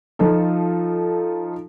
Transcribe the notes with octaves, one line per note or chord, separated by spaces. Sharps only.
F3 D#4 F4 A4